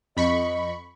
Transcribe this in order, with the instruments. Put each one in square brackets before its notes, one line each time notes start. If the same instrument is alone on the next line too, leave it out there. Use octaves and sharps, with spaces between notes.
[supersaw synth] F2 B5 C#6 [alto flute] D#5